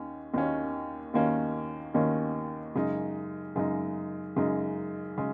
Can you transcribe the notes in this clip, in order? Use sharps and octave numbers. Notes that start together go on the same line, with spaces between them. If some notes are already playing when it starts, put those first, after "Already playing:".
Already playing: D#2 D#3 C#4
D#2 D#3 A#3 C#4
D#2 D#3 A#3 C#4
D#2 D#3 A#3 C#4
F#2 C#3 G#3 D#4
F#2 C#3 G#3 D#4
F#2 C#3 G#3 D#4
C#3 G#3